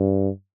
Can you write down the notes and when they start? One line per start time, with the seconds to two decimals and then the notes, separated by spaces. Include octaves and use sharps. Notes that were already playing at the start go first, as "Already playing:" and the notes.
Already playing: G2